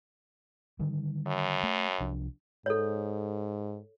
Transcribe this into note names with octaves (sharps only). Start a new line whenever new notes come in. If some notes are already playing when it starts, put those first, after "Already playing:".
D3 D#3 G3
F#2
A3
C2 F3 D4
G#2 A4 C#5